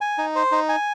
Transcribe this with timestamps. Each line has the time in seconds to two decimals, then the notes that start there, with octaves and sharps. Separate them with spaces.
0.01 G#5
0.18 D#4
0.35 C5
0.52 D#4
0.69 G#5